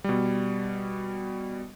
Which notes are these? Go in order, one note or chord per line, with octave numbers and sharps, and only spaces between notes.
B2 G3